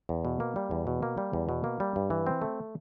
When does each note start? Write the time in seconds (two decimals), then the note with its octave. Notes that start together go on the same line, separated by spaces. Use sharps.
0.09 E2
0.25 B2
0.40 A#3
0.56 G3
0.71 E2
0.87 B2
1.03 A#3
1.18 G3
1.33 E2
1.49 B2
1.64 A#3
1.80 G3
1.96 G2
2.10 E3
2.27 C4
2.42 A3